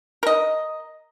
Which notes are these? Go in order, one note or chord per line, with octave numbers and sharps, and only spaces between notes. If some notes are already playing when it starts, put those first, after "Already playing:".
A#4 D#5